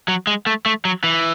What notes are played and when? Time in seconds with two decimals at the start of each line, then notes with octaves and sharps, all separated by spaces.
0.08 F#3
0.27 G#3
0.46 A3
0.66 A3
0.85 F#3
1.04 E3